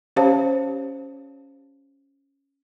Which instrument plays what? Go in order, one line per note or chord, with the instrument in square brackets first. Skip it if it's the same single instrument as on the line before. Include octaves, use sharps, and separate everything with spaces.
[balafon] C#4 G4 C5 C#5 F5 A5